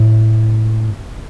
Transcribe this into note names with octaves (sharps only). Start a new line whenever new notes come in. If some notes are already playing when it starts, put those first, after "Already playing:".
Already playing: A2